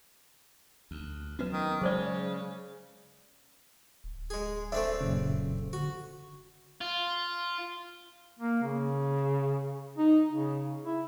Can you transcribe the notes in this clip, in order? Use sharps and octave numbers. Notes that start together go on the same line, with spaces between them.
D2
F#3 B3 C#4 F#4 B4
D#3
C#3 F#3 G#3 G#4 C5 D5
D1
G#3 G#4
A3 C4 D4 E5
F#2 A#2 C#3
D3 F#4
F4
A#3
C#3
D#4
C#3
E4